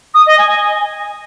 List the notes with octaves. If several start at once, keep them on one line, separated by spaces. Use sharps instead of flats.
D#6
D#5
G#5